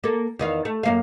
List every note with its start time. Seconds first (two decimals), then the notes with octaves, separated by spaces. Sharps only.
0.04 A#3 A4
0.39 E2 D#3 F5
0.65 A3
0.83 F#2 A#3 F5